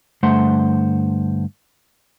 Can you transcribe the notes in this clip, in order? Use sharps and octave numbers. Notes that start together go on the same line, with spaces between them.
G2 D3 A3 C5 F#5 C6